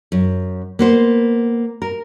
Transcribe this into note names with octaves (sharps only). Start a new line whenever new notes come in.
F#2
A#3 B3 C5
A#4